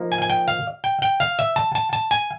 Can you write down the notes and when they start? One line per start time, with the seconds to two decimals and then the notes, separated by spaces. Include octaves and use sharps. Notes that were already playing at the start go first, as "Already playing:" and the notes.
Already playing: F3 A#3 D#4
0.12 G#5
0.22 G#5
0.30 G5
0.48 F5
0.84 G5
1.02 G5
1.20 F5
1.39 E5
1.56 A5
1.75 A5
1.93 A5
2.11 G#5